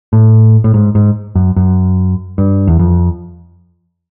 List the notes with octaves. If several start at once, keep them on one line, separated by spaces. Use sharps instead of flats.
A2
A2
G#2
G#2
F#2
F#2
G2
E2
F2